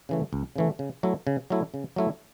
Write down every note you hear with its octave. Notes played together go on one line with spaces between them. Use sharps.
C#3 E3 A3
C#2
C#3 E3 A3
C#3
F#3 A3 E4
C#3
F#3 A3 E4
C#3
F#3 A3 E4